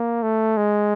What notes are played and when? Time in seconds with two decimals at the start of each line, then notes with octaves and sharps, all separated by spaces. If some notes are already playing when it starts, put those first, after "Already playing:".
Already playing: A#3
0.22 A3
0.57 G#3